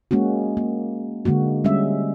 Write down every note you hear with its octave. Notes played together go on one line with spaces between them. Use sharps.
G#3 A#3 C#4 F#4
A#3
D3 G#3 A#3 F#4
G3 G#3 C#4 E5